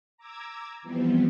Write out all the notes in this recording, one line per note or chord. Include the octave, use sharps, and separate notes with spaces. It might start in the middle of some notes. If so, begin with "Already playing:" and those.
A#5 D6 E6 G#6
E3 F3 G3 B3 C4